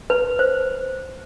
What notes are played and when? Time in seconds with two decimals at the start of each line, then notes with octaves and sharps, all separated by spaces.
0.10 B4
0.39 C5